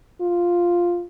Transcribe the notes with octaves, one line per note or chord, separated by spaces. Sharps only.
F4